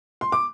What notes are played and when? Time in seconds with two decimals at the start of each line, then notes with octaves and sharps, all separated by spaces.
0.21 C6
0.32 D6